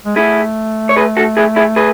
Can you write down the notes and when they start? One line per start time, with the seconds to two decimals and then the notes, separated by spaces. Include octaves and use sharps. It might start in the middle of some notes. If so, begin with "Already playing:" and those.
0.06 G#3
0.16 A3 E4 G#4
0.89 C#5
0.96 G#4 B4
1.17 F#4 A4
1.37 E4 G#4
1.56 E4 G#4
1.76 G#4 B4